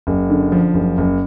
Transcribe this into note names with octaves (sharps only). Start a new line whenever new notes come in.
F#1
D3
F3
F#1
F#1